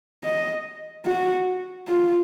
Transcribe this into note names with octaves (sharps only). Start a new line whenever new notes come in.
D#5
F#4
F4